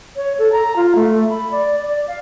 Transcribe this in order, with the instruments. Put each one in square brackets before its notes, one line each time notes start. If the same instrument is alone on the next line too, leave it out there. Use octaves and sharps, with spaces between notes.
[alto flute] C#5
A4
A#5
F4
A3
B5
D5
D5
F5